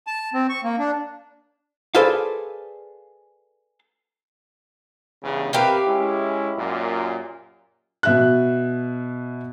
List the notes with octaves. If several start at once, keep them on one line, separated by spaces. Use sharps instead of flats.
A5
C4
C#6
A#3
D4
G#4 A4 B4 C5 D5 F5
E2 G2 C#3
C4 G4 A#4 B4 E5 F5
G#3 C#4 E4
F#2 A#2
B2 E5 F#6